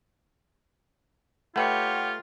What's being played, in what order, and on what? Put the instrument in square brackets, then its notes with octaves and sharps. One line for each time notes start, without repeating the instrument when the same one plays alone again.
[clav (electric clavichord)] A3 B4 [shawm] F4 [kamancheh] G4 C#5 [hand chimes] F#5 G5